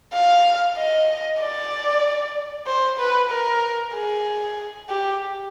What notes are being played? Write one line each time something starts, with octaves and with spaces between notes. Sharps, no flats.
F5
D#5
D5
C5
B4
A#4
G#4
G4